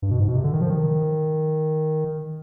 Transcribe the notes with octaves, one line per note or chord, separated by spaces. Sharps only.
G2
B2
G#2
B2
C3
D3
D#3
F3
D#3